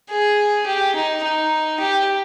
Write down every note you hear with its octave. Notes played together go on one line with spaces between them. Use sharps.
G#4
G4
D#4
D#4
G4